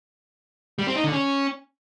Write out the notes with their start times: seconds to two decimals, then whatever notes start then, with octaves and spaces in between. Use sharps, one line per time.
0.79 G3
0.87 C4
0.95 D#4
1.04 D3
1.12 C#4